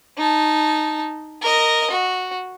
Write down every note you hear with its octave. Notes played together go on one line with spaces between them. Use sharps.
D#4 A5
A#4 D#5
F#4